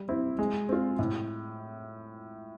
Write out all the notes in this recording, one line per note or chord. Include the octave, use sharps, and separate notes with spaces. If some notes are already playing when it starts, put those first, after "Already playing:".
Already playing: G3
C4 E4
G#3
C4 F4
A2